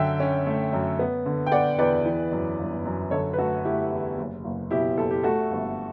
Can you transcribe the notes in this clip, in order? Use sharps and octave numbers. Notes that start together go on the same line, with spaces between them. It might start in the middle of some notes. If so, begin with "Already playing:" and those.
Already playing: F#2 D3 E5 G5
C#4
A3
F#2
B3
D3
G5
B3 D5 F#5
E2 B4 D5
E3
F#2
G1
F#2
D3 A4 C#5
B4
A3 F#4 A4
A3 E4 G4
E2
F#1
F#1
B2 E4 G4
F#1 A4
G4
A3 F#4 A4
G1